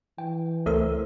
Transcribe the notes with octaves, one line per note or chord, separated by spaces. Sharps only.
E3 G5
C#2 A3 A4 A#4 C5 E6